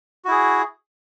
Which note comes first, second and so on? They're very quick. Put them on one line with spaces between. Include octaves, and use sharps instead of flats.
F#4 E4 G#4